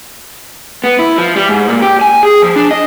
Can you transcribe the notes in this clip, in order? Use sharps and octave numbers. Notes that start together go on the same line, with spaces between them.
B3
E4
F3
G3
G#2
A#2
G4
G#5
G#4
F3
D4
D#5